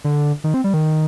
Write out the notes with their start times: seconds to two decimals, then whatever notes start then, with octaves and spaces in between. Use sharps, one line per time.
0.04 D3
0.44 D#3
0.54 C4
0.64 G3
0.74 D#3